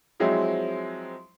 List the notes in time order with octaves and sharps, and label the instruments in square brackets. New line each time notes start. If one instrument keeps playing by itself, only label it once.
[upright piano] F3 F#3 G#3 C4 E4